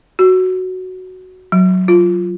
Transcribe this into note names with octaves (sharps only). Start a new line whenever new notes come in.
F#4
F#3
F4